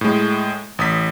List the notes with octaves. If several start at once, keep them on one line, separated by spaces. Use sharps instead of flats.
A2 G#3
A1 D#6 B6